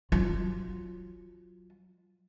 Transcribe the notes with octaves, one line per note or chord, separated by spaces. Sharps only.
F#3 F4